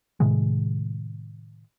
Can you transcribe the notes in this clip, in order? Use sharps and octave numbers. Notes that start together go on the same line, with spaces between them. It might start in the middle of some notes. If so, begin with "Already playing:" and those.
A2 C3 D#3 G#3